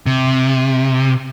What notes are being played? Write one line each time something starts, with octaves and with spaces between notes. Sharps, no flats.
C3